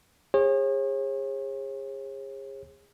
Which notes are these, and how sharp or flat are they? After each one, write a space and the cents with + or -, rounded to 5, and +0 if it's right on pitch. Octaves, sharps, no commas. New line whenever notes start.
G#4 -35 C#5 -40